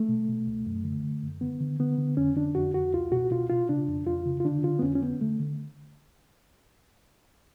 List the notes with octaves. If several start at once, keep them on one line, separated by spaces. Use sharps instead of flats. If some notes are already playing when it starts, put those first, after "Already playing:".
Already playing: A3
B2
B2
C#2
F#2
D3
D3
F#2
D3 B3
D3
D3 B3
D3
F2 C#4
D3 D4
F2 F#4
F2 F#4
C#2 F4
B2 F#4
B2 F4
B2 F4
C#3 D4
F2
F2 F4
C#3
F4
D3 D4
D3 F4
B3
F2 C#4
C#4
D3 B3
D3 A3
D3